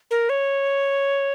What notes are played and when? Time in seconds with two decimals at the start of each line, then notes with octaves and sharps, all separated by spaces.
0.11 A#4
0.29 C#5